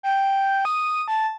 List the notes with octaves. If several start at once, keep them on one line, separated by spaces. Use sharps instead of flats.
G5
D#6
A5